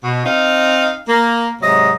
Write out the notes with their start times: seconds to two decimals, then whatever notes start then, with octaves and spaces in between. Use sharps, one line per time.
0.04 B2
0.26 C4 D#4 F5
1.08 A#3
1.62 G#2 C3 F#3 D#5